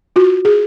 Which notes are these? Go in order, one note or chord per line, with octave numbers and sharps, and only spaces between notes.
F4 F#4
G#4